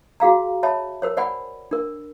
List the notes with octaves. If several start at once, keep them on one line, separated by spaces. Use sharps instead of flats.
F#4 G#4 F5 A#5
C#5 E5 A5 B5
A#4 C5 C#5
C5 D5 F#5 G#5 B5
D4 A#4